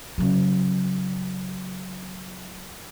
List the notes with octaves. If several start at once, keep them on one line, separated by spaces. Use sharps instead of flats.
C#3 F#3